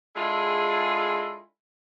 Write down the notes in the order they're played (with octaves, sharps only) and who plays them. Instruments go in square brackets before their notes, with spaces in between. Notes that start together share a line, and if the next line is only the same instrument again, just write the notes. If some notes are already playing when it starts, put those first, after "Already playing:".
[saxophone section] G#3 D4 E4 F4 G#4 A4